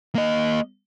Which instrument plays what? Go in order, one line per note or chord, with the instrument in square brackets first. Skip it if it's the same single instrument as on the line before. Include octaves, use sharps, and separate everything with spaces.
[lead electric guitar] A#3 D#5